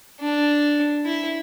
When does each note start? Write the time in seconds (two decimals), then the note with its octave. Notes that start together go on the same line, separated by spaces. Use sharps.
0.20 D4
1.05 E4